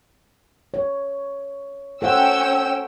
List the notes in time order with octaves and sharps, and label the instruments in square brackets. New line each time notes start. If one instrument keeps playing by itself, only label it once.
[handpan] C#5
[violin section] C#4 G5 E6 [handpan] A4 C5 F#5